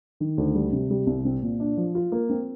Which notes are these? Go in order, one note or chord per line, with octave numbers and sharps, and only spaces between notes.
D#3
D2
G3
C3
G3
C2
C4
A#2
D4
F3
F4
A#3
C4